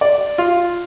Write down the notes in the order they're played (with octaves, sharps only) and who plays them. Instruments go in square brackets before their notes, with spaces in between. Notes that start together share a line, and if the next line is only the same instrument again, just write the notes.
[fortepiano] D5
F4